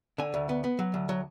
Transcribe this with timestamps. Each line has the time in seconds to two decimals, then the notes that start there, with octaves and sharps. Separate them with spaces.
0.18 D3 G#5
0.34 D2
0.49 B3
0.64 B3
0.79 F#3
0.94 D2
1.09 F#3